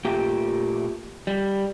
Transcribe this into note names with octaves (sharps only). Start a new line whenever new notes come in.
A#2 A3 G4 G5
G3